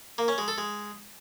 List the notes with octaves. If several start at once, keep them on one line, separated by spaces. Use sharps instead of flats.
A#3
C#4
G#3
A4
G#3